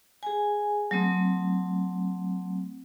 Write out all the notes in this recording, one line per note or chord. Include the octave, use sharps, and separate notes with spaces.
G#4 G#5
F#3 A3 C4